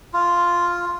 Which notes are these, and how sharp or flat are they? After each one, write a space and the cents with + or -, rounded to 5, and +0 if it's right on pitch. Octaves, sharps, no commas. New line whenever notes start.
F4 +0